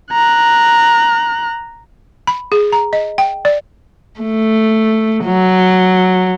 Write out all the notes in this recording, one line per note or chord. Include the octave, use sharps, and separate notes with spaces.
A#5 F#6
B5
G#4
A#5
D#5
G5
D5
A3
F#3